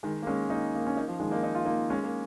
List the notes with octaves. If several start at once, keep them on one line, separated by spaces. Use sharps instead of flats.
D#3 G#3
A#3
G#3 C#4
A#3 D#4
A#3
C#4
A#3 D#4
F3
D#3 G#3
A#3 D#4
D#4
F4
A#3 D#4
G#3 C#4
A#3